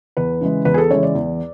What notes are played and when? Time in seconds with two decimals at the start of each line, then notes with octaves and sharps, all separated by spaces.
0.17 E2 B4
0.41 C#3 E3 G#3
0.65 E2 B4
0.74 G#4
0.78 A4
0.90 C#3 E3 G#3 C#5
1.03 D5
1.15 E2